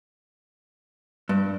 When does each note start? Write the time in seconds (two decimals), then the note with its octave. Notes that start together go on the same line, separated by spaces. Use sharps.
1.29 G2